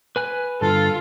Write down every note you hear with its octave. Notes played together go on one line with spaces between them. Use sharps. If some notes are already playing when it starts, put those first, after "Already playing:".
B4 G#5 F#6
G2 D3 F4 A4